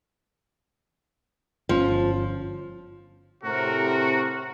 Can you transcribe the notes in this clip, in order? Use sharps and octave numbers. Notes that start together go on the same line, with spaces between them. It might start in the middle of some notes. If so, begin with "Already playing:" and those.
G1 A#2 F3 C#4
A2 C3 F#4 A#4